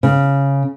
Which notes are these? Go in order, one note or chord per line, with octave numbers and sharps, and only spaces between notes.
C#3